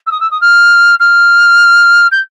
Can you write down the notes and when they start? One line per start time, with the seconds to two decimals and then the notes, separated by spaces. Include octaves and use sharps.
0.06 E6
0.11 D#6
0.20 E6
0.31 D#6
0.41 F6
1.00 F6
2.12 G6